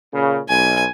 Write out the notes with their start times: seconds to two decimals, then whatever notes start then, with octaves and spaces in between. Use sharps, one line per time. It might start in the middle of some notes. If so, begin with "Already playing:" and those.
0.13 A#2 C#3
0.49 B1 G#5